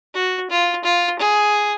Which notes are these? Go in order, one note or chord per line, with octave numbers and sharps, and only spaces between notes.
F#4
F4
F4
G#4